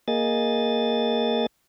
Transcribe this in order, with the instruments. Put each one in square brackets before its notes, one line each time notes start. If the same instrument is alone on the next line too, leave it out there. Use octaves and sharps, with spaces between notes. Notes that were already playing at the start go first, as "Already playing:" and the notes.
[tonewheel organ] A#3 G#4 D#5 A6